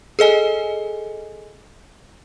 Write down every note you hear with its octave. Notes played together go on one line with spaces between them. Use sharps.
G#4 A4 D#5 G#5